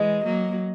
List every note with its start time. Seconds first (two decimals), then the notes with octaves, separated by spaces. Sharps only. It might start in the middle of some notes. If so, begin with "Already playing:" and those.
Already playing: E3 G#3 D#5
0.24 F#3 A#3